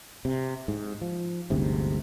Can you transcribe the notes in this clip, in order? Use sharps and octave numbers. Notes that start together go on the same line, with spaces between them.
C3
G#2
F3
G1 D2 G#2 C3